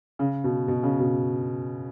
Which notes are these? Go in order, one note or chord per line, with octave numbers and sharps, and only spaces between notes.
C#3
B2
B2
C#3
B2